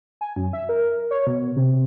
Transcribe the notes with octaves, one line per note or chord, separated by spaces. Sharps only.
G#5
F#2
E5
A#4
C#5
B2
C3